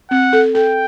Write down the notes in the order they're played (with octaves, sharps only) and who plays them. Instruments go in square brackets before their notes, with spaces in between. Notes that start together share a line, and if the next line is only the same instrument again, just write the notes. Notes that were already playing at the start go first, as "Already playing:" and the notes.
[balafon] C4 [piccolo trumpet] F#5
[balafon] A4
[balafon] A4 [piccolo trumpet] G5